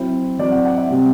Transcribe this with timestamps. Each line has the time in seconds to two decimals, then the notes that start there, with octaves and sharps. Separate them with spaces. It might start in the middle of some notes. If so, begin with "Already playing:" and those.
Already playing: F#3 C4 E4 C5
0.39 F#3 C4 E4 D5
0.52 F#5
0.65 F#5
0.77 E5
0.89 C3 G3 C4